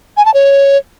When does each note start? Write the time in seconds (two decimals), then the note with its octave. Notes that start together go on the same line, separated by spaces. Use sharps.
0.17 G#5
0.25 A5
0.34 C#5